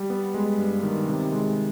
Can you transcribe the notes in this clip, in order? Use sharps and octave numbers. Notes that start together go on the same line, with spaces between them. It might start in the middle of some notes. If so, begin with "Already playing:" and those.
Already playing: G3
B3
G#3
G2
D#3
C3
G#3